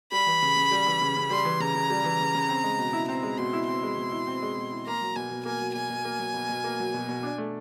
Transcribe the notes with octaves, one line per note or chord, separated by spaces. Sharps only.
G3 B5
E3
C#3
C#3
G3
E3
C#3
C#3
G3 C6
E3
C#3 A#5
C#3
G3
E3
C#3
C#3
C4
G#3
B2
E4
C4 A#5
G#3
B2 C6
E4
C4 C6
G#3
B2
E4
C4
G#3
B2
E4
A#3 A#5
F#3
B2 G#5
B2
A#3 G#5
F#3
B2 G#5
B2
A#3
F#3
B2
B2
A#3
F#3
B2
B2
D4
A3